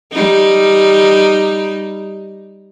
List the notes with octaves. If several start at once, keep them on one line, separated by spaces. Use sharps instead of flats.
G3 D#4